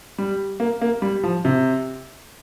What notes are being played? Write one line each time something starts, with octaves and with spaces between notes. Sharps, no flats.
G3
A#3
A#3
G3
F3
C3